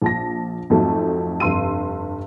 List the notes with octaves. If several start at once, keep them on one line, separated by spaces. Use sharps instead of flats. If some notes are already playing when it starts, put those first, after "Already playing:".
A#1 A5 A#6
F2 G#2 F3 F#3 A3
F1 G2 C6 E6 D#7